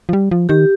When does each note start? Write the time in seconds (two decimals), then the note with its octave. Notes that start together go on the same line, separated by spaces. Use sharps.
0.09 F3
0.13 G3
0.31 F3
0.49 D#3 G4